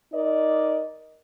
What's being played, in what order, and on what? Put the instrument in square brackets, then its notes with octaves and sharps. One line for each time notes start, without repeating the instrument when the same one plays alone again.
[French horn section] D#4 A#4 D5 D#5